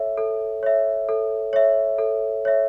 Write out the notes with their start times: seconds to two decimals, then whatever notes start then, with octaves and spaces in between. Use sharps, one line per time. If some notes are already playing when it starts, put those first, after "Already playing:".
Already playing: A4 C#5 E5
0.18 A4
0.63 C#5 E5
1.09 A4
1.53 C#5 E5
1.98 A4
2.45 C#5 E5